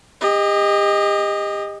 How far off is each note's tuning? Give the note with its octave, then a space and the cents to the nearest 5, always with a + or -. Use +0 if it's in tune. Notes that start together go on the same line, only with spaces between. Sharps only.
G4 +40 D#5 +0